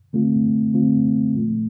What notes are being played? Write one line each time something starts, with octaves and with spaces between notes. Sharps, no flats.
D3 A3 C4 F4
D3 A3 C4 F4
A#2 F3 A3